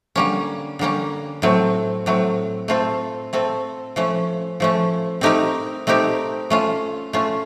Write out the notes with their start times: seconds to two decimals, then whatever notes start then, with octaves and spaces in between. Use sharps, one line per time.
0.16 D3 G3 A#3 C#4
0.79 D3 G3 A#3 C#4
1.42 A2 F#3 A3 C4
2.06 A2 F#3 A3 C4
2.68 A3 C4 F4 A4
3.33 A3 C4 F4 A4
3.96 F3 A3 C#4
4.60 F3 A3 C#4
5.21 A3 C4 D#4 G4 A#4
5.87 A3 C4 D#4 G4 A#4
6.50 A3 C#4 F4
7.13 A3 C#4 F4